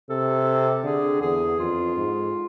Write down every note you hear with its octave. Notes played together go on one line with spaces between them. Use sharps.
C3 A4
D3 G#4
E2 G#4
F2 F4
G#2